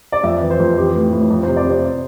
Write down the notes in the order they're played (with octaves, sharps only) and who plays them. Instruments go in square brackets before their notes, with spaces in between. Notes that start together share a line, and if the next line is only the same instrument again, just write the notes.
[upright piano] D5
F2 E5
E3
C5
F2
E3 G4
A2
A2
F2
C3 C5
D5
C3 C5